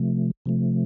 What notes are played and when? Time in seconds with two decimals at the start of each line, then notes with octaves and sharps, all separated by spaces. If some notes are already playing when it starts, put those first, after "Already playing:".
Already playing: C3 F3 A3
0.46 C3 F3 A3